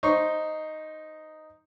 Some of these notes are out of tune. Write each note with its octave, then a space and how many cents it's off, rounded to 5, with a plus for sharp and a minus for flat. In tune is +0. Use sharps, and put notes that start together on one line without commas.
D#4 +0 C5 +0 C#6 +0